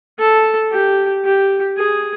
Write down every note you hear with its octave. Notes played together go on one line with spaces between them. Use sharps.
A4
G4
G4
G#4